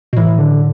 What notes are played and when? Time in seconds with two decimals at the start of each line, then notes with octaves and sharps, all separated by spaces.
0.13 B2
0.17 A2 E3
0.39 D3